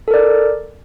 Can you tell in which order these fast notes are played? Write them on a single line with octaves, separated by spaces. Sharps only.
A4 A#4 D5